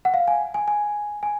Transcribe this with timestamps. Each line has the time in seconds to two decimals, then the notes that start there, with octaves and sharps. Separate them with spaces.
0.05 F#5
0.14 F5
0.28 G#5
0.54 G#5
0.68 G#5
1.23 G#5